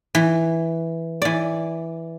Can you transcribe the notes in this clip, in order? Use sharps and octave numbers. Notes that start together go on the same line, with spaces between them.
E3
E3 D5